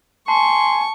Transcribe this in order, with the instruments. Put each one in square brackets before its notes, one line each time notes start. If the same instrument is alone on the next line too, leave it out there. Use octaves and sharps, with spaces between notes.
[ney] G#5 [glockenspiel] A5 [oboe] C6 [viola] C#6